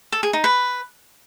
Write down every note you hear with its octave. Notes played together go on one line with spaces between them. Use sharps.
A4
G#4
D#4
B4